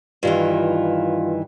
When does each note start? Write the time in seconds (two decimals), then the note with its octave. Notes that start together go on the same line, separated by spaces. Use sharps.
0.23 G2 D#3 E3 F4